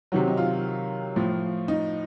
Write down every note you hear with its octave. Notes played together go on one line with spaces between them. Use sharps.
C3 D#3 F#3 F#4
D#4
F4
A2 F3
D#4